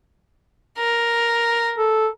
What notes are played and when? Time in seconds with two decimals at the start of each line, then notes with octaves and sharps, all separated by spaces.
0.78 A#4
1.78 A4